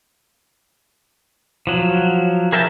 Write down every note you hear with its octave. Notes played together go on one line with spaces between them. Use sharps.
F3 F#3
G#4 A#4 E5 G5 A5